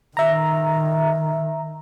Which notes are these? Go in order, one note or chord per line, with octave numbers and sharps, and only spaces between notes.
D#3 E5 A#5